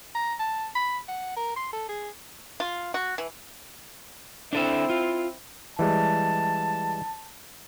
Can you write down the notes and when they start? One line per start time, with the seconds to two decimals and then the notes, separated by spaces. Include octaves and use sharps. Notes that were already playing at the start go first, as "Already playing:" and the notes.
0.15 A#5
0.40 A5
0.75 B5
1.08 F#5
1.36 A#4
1.56 C6
1.73 A4
1.89 G#4
2.60 F4
2.94 F#4
3.18 E3
4.53 C4 D4 E4 A4 E5
4.90 F4
5.79 E3 G3 G#3 A5